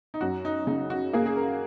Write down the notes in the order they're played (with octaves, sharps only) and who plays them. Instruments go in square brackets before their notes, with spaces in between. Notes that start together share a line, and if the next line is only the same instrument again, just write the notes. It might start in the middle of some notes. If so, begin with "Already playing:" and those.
[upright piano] D#4
[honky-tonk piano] F#2 [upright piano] F#4
[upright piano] D#4
[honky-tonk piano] C#3 [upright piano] D#4
[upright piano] F#4
[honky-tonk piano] A#3 [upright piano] G#4
[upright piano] G#4
A#4